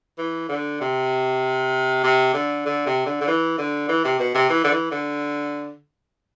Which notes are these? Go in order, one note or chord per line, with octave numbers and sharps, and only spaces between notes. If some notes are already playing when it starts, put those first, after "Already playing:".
E3
D3
C3
C3
D3
D3
C3
D3
D3
E3
D3
E3
C3
B2
C3
E3
D3
E3
D3